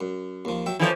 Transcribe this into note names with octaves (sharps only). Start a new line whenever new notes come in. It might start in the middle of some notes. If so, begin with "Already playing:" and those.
F#2
D#2 F3
F#3 E5 G5
E3 F3 E4 A4 C#5